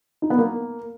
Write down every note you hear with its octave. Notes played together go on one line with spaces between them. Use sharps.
D#4
B3
A#3